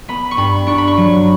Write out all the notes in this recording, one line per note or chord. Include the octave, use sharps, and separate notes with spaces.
B3 B5
C#6
G2 B5
D4 C#6
B5
C#6
F#3